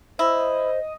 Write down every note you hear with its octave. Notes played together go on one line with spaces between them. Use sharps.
E4 C5 D#5